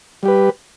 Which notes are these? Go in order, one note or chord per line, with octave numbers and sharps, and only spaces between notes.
G3 G4 B4